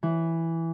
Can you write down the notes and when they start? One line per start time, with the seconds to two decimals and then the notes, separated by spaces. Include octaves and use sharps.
0.03 E3